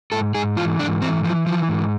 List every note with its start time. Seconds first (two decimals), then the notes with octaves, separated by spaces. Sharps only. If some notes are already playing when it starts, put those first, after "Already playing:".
0.12 G#2 A4
0.35 G#2 G#4
0.57 E3 F4
0.79 G#2 D4
1.02 E3 C4
1.24 E3 F3
1.47 E3 F3
1.69 G#2